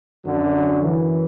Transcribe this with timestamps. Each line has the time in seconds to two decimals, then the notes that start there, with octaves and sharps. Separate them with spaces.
0.25 F#2 D3 F#3
0.53 F#3
0.82 F#2 E3